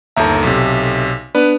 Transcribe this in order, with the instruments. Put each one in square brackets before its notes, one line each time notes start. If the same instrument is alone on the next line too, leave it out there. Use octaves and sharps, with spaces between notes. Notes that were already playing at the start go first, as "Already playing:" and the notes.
[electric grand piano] G1 D#2 A#5 [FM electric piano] A4 E5
[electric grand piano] B1 C3
[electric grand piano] B3 B4 [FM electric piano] D4